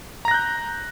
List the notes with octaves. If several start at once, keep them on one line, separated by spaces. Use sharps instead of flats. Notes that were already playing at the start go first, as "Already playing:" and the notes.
A#5 F#6 G6 A#6